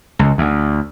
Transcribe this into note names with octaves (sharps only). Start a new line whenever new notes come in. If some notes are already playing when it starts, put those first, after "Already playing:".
C#2
D2